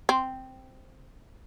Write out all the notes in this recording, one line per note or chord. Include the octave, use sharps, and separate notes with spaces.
C4